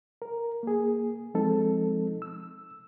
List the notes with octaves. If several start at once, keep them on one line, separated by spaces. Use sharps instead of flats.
A#4
A#3 G#4
F3 G#3 C4 D#4 A4
E6